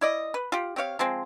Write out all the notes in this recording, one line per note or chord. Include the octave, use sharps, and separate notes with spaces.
E4 D5 D#5
B4
F4 G4
C4 G4 C#5 F5
F3 G#3 C4